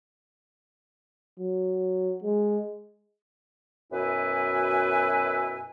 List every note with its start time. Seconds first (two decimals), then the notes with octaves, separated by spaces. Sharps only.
1.40 F#3
2.24 G#3
3.92 F#2 B2 E4 B4 G#5